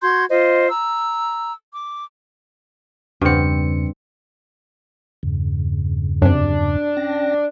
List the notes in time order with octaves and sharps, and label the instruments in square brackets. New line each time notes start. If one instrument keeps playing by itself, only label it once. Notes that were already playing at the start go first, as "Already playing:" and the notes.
[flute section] F#4 C6 G6 G#6
F4 C5 D#5
A#5 E6
D6
[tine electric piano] E2 C#3 C#7 [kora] G2 C4
[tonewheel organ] E2 G2 C#3
[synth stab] F#2 C3 [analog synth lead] D4
[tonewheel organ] C#4 G5 A#6